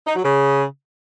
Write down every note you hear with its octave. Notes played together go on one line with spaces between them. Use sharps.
D#4
F#3
C#3